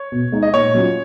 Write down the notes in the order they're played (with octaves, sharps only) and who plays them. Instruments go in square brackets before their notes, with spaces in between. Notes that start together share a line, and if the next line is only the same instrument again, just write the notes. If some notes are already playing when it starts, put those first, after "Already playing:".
Already playing: [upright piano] C#5
[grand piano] B2
G#3 D#4
[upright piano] D#5
[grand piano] A#2 [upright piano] C#5
[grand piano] F#3 C#4 F4